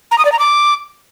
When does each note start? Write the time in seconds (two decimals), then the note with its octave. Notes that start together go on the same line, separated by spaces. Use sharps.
0.11 A#5
0.18 D#6
0.25 D5
0.32 A#5
0.39 D6